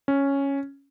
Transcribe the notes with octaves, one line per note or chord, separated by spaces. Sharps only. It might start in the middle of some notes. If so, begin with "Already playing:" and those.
C#4